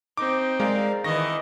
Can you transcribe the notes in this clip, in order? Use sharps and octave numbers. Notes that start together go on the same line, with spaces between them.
C4 D#4 D6
G#3 A#4 D5 F5
D#3 E3 D#5 C#6 A#6